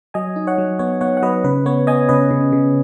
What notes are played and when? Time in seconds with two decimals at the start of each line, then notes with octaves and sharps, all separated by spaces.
0.14 F#3 D#5 G#5
0.36 D#4
0.47 C#5 F#5
0.58 F#3
0.79 B3 C#5
1.01 B3 C#5 F#5
1.17 F#5
1.22 F#3 B4 D#5
1.44 C#3 B4
1.66 B3 C#5
1.87 B3 D#5 G#5
2.09 C#3 B4 D#5
2.31 C#3
2.52 C#3